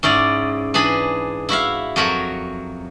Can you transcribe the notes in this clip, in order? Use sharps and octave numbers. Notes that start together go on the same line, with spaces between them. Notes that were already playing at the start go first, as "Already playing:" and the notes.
G#2 C#4 E4 D5
E3 D4 G#4 B5
E4 F#4 E5 F5
F2 F#3 F#4 A#4 C#5 B5